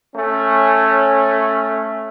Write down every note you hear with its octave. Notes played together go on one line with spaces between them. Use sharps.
A3 C#4